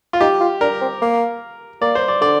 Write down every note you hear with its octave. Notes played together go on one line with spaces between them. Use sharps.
F4
D#4 G4
F4
D4 A#4
C4
A#3
A#3 D5
C5
D5
D3 D5